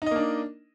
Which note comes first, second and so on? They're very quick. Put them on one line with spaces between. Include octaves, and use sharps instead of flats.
D#4 D#5 A#3 D4